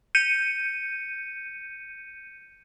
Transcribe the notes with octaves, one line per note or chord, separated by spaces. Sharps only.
G6 C#7 D#7